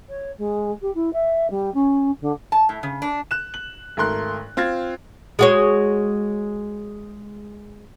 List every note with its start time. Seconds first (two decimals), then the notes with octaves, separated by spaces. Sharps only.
0.09 C#5
0.38 G#3
0.81 G4
0.94 E4
1.13 E5
1.50 G3
1.74 C#4
2.21 D3
2.52 A5
2.69 A2
2.83 C#3
3.02 D4
3.31 F#6 E7
3.54 F#7
3.97 G#1 A3 A#4 C6 F#6
4.57 C4 F4 G#6 A6
5.39 G#3 F#4 C#5